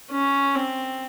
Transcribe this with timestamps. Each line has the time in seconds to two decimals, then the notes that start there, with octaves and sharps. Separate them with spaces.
0.11 C#4
0.55 C4